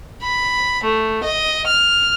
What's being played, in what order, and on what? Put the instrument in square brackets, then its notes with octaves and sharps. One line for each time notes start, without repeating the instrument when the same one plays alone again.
[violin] B5
A3
D#5
F6